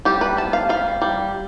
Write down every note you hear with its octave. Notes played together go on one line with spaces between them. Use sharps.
G3 G4
B4
B3 A5
F5
G3 F5
G3